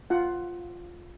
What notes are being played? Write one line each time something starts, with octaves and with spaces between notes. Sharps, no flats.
F4 F#5